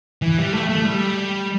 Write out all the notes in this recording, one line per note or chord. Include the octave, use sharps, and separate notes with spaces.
E3
G3
A3
A3
G3